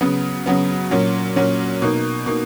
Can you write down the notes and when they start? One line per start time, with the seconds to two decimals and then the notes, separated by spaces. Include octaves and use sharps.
0.01 C#3 F#3 B3
0.46 C#3 F#3 B3
0.91 A#2 F#3 C#4
1.36 A#2 F#3 C#4
1.82 B2 A#3 D#4
2.26 B2 A#3 D#4